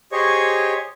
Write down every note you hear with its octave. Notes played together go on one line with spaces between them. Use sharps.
G4 G#4 C5 C#5 D#5 C#6